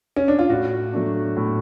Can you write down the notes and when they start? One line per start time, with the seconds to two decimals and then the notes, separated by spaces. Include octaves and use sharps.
0.16 C#4
0.28 D4
0.39 F4
0.49 A2 F#4
0.93 F#3 A3 D4
1.37 A2